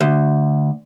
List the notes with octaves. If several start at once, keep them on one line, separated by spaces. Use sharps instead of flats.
D2